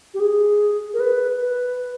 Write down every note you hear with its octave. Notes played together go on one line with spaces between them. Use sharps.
G4
G#4
A#4
B4
B4